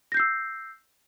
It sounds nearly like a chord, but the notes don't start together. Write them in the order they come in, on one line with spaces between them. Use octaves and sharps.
A#6 G6 C7 E6